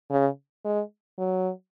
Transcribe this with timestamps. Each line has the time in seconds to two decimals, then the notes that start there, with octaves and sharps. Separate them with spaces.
0.11 C#3
0.65 G#3
1.18 F#3